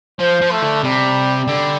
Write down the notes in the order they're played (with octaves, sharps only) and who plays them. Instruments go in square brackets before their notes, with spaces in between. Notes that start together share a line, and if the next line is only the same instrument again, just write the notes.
[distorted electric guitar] F3 [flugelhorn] C5
[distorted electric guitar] F3
[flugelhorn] A3
[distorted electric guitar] D3
[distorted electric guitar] C3 [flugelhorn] G3
[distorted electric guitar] D3 [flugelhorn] G3